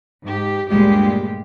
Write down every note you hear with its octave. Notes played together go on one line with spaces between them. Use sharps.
G#2 G4
D2 G2 A#2 G3 G#3 G4